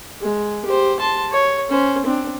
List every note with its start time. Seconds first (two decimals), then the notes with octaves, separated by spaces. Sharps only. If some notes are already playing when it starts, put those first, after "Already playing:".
0.22 G#3
0.66 G4 C5
1.00 A5 C6
1.32 C#5
1.70 C#4 C5
2.06 C4 D4